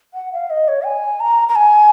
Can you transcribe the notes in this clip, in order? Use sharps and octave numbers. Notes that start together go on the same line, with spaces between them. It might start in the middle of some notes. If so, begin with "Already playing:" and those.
F#5
F5
D#5
C#5
G#5
A#5
A#5
G#5